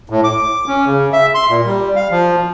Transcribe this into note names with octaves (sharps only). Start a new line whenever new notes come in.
A2
D6
C#4
C#3
E5
C6
A#2
G3
F5
F3